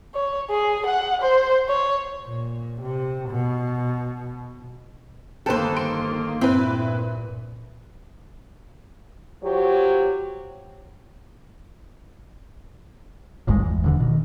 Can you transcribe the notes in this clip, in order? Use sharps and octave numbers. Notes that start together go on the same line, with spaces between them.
C#5
G#4
F#5
C5
C#5
A#2
C3
B2
G1 D#3 A#3 A4 B4 C5 G5
C6 D7
G2 A#2 C4 E4 B4
F#3 F4 G4 C5 C#5
D1 G#1 G2 G#3
E2
D#1 D3 E3
B2 D#3